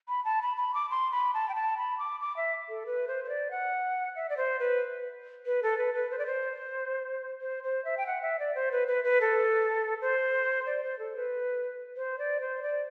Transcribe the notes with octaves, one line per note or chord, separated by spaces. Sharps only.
B5
A5
B5
B5
D6
C6
B5
A5
G5
A5
B5
D6
D6
E5
A4
B4
C5
C5
D5
F#5
E5
D5
C5
B4
B4
A4
B4
B4
C5
D5
C5
C5
C5
E5
G5
F#5
E5
D5
C5
B4
B4
B4
A4
C5
D5
C5
A4
B4
C5
D5
C5
D5